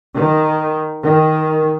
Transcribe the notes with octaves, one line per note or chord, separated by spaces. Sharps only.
D#3
D#3